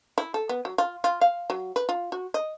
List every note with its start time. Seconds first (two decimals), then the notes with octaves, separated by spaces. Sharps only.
0.18 E4
0.34 A4
0.49 B3
0.65 F#3
0.78 F4
1.04 F4
1.21 F5
1.50 F#3
1.76 B4
1.89 F4
2.12 F#4
2.34 D#5